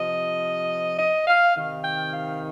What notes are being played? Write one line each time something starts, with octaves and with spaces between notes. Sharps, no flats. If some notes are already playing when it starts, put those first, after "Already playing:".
Already playing: C3 F3 D#5
D#5
F5
C3 D#3
G5
F5